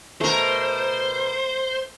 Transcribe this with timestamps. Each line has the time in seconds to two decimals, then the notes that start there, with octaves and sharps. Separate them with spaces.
0.21 B2 A3 A#4 C5